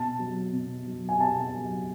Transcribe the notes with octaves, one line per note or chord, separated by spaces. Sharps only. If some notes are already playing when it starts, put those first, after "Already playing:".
Already playing: B2 A5
F#3
B2
F#3
G#5
B2 A5
F#3